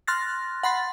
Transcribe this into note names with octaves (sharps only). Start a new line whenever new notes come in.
C6 F6 F#6 A6 A#6
F#5 B5 C6 A6